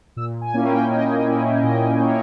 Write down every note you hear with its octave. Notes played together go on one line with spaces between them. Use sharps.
A#2 E6
G#5
A#3 C#4 E4
G5
A#2 D#5
A#3 C#4 E4
A#2 D#5
A#3 C#4 E4 C#5